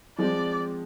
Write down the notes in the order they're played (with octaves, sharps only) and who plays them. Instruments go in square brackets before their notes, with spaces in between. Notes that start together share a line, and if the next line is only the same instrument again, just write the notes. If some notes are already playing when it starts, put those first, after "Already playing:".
[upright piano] F3 G#3 C4 [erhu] D5